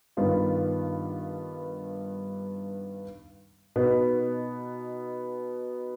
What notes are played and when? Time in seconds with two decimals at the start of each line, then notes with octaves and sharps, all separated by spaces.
0.17 G2 D#3 B3 F4
3.76 B2 B3 D#4 B4